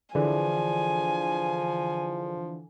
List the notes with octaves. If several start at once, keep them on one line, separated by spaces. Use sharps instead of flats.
D3 E3 F3 G#4 D5 G#5